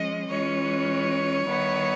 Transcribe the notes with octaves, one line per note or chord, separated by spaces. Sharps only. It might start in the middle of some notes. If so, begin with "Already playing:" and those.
Already playing: F3 G#3 C#4 D#5
E3 G#3 C#4 F4 C#5
D#3 G3 B3 E4